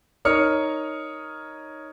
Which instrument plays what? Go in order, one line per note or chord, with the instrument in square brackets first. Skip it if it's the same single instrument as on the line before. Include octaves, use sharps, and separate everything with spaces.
[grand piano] D#4 A#4 C#5 D#6 F6 C#7